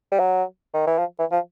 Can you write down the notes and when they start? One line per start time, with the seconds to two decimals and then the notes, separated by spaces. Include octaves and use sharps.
0.12 G3
0.19 F#3
0.74 D#3
0.87 E3
0.99 F3
1.19 E3
1.31 F3